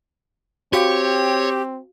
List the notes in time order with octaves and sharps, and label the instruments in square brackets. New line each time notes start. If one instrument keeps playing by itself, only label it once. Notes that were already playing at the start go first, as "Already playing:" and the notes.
[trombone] C4 [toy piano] F#4 F5 [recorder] G4 [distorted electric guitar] C#5